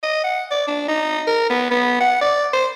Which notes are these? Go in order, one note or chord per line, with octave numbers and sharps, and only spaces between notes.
D#5
F#5
D5
D4
D#4
A#4
B3
B3
F#5
D5
C5